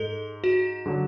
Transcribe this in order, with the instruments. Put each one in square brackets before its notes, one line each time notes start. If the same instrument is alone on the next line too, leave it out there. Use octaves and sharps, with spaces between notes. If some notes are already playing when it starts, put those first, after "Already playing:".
Already playing: [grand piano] G#2 [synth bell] A4
[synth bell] F#4
[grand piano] D3 F#3